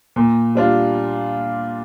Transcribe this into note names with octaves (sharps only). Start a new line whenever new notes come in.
A#2
G3 D4 F4